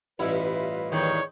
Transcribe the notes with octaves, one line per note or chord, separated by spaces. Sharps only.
A1 G2 E4 F4 B4 D#5
E2 D#3 C#5